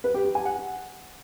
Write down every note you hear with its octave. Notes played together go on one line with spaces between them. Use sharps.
B4
G4
G4
G#5
F#5